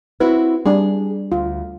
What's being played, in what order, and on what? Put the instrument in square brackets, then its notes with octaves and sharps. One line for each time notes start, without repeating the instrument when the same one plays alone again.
[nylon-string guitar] C4 E4 F#4 [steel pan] B4
[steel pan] G3 D4 [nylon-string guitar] G#4
[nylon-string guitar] D2 [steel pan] F4